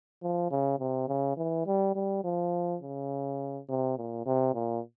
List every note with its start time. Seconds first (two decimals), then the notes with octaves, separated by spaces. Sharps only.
0.23 F3
0.51 C#3
0.79 C3
1.09 C#3
1.37 E3
1.67 G3
1.96 G3
2.25 F3
2.82 C#3
3.69 C3
3.98 A#2
4.26 C3
4.54 A#2